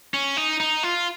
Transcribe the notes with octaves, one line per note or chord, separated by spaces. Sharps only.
C#4
D#4
D#4
F4